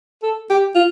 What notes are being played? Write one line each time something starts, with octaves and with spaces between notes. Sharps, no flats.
A4
G4
F4